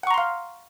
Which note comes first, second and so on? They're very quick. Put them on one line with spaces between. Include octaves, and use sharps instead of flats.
F#5 C#6 A#5 C6 F5